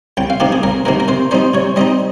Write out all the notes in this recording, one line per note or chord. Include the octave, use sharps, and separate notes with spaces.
C2 G5
F5
C3 D#3 A#3 G4
G#4
C2 A#4
C3 D#3 A#3 A#4
A#4
C3 C5
G3 C4 D#4 C5
C3 C#5
G3 C4 D#4 D#5